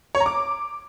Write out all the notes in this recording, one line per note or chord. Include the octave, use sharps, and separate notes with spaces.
C#5
A#5
D6